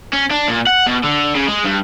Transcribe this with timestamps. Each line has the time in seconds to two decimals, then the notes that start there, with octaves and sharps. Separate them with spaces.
0.13 C#4
0.30 D4
0.48 A#2
0.67 F#5
0.87 B2
1.04 D3
1.35 C#3
1.48 G#3
1.65 G2